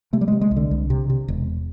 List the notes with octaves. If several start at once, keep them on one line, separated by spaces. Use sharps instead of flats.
C3 A3
G3
C3 G#3
G#3
C2
D3
C2
C3
C3
E1